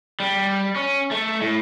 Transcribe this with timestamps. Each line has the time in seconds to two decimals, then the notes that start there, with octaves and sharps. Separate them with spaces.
0.20 G3
0.76 C#4
1.11 A3
1.42 A2